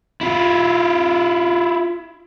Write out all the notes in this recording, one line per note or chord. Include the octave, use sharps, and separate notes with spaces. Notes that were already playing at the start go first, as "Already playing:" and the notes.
E4 F4